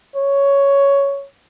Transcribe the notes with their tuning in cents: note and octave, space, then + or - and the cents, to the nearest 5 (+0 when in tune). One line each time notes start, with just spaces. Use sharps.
C#5 +5